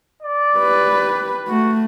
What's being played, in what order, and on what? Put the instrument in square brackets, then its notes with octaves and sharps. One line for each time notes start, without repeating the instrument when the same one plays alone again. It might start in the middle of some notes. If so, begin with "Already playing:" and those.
[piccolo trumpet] D5
[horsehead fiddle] G4 B4
[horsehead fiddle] A3 [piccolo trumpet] F#4